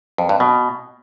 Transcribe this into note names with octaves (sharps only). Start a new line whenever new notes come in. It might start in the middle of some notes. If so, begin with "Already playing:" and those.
F2
G2
B2